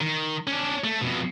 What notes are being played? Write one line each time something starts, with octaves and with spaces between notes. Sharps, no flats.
D#3
C#4 D4
A3
F2 B2